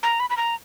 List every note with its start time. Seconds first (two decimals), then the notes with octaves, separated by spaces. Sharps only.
0.03 A#5
0.20 B5
0.30 B5
0.37 A#5